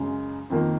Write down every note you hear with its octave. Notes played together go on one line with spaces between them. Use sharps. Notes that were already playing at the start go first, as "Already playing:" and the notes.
Already playing: F#2 C#3 G#3
F2 D#3 A#3